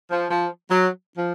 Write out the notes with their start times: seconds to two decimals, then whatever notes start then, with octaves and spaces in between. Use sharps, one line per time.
0.10 F3
0.30 F3
0.70 F#3
1.16 F3